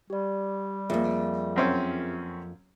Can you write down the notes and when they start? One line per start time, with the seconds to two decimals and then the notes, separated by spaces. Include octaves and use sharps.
0.10 G3 G4 D5
0.90 F2 A#3 F4 G#4 E5
1.56 F#2 C4 C#4